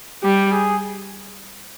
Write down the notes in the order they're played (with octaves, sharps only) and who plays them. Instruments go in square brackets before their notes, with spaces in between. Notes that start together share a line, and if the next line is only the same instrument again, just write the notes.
[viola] G3 [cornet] G4
[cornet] G#4